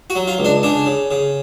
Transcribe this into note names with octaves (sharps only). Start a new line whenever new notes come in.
F#4
F#3
F4
C#2
D4
C#3 D4
C#3
C#3